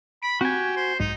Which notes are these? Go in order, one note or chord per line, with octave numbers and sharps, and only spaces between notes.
B5 D7
C4 F#4 G4 G#5
C5
B1 G#2 G#3 D#4